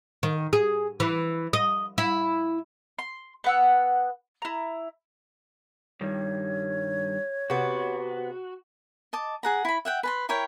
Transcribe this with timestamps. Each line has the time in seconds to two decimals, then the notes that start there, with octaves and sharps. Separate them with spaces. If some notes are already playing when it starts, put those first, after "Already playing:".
0.23 D#3
0.53 G#4
1.00 E3
1.53 D#5
1.98 E4
2.99 C6
3.44 B3 F#5 E6
4.42 E4 A#5
6.01 G2 D#3 G3 C#5
7.50 C3 B3 F#4
9.13 D#5 A5 D6
9.43 G#4 F#5 A#5
9.65 E4 B5
9.85 E5 F#5 G5
10.03 B4 A5 C6
10.29 E4 A#4 C#5 G5